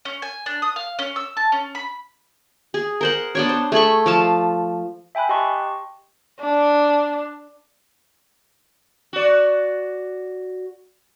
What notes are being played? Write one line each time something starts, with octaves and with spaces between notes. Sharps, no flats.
C#4
G#5
D4
D#6
F5
C#4
E6
A5
C#4
B5
G#4
A#4 C5 F#5
B3 D4 C#5
C5
A3 G#4 B5 C#6
F3 F5 A5
E5 G5 G#5 B5 F#6
G4 D#5 G5 A5 C6 C#6
D4
F#4 D5